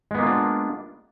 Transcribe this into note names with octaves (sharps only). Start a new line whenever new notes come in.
G#3 A#3 B3 D4 F4